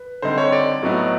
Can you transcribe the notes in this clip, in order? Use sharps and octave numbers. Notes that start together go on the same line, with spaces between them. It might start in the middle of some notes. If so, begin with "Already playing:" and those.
Already playing: B4
D3 G3 C4 D#4 C5
C#5
D5
A2 F#3 B3 D#4